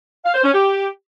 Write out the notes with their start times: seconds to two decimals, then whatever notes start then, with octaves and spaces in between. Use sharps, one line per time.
0.25 F5
0.34 C5
0.44 C#4
0.54 G4